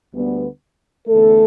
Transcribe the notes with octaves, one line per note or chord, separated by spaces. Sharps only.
D2 D3 G3 B3
E2 D3 A3 B3 A4